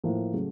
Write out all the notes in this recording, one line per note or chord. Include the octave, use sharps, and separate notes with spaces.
A2 F3 A#3
C#3 F#3 A3